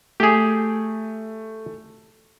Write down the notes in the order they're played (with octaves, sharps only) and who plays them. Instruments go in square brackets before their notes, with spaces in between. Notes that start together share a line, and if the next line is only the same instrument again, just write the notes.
[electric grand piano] A3 [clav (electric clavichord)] G4 G#4